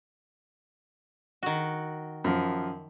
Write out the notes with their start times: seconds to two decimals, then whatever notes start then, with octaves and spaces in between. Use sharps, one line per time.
1.43 D#3 F#4
2.24 F#2 F3